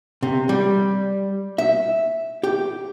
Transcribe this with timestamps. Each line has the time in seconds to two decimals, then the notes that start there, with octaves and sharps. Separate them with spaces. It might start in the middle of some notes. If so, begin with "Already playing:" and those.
0.23 C3
0.49 G3
1.58 E5
2.43 G4